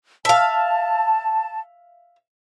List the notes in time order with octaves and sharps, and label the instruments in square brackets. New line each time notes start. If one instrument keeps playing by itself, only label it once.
[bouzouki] E5 F5 [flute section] A5